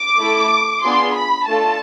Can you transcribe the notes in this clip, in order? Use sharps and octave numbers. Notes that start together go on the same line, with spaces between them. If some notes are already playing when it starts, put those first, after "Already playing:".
Already playing: D6
A3 E4 A4
B3 D4 F4 G#4 C6
B5
A3 D4 F4 A4 A5